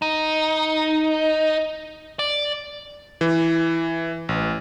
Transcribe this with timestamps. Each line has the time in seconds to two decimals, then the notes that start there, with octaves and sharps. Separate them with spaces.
0.02 D#4
2.19 D5
3.21 E3
4.29 A1